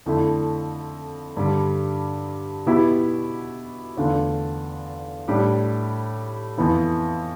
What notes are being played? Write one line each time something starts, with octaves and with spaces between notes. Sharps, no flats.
F2 D3 A3 E4
G2 D3 G3
B2 B3 E4 G4
E2 D3 A3 D4 F4
A2 G3 D4 G4
F2 E3 B3 E4